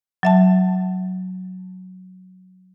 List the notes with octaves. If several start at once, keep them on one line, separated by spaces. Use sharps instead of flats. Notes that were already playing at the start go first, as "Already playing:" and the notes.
F#3 E5 A5